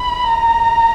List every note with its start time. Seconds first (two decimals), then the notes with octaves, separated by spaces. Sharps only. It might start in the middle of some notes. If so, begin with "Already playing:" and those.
Already playing: B5
0.24 A#5